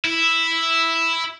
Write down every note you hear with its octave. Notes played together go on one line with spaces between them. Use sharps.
E4